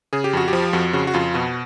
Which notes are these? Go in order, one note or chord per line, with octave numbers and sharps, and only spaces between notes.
C#3 G#4
G4
F2 F#4
G4
F3
F2 F#4
C#3 F#4
F#4
F2 F4
B2 F#4